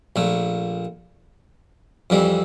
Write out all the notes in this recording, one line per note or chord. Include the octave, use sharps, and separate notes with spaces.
A#1 A#2 A3
F2 E3 G3 C4